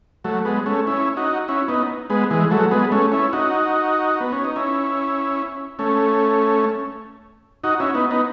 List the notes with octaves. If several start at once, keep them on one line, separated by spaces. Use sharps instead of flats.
F#3 A3
G#3 B3
A3 C#4
C#4 E4
D#4 F#4
C#4 E4
B3 D#4
G#3 B3
E3 G#3
F#3 A3
G#3 B3
A3 C#4
C#4 E4
D#4 F#4
B3
C#4
D#4
C#4 E4
A3 C#4
D#4 F#4
C#4 E4
B3 D#4
B3 D#4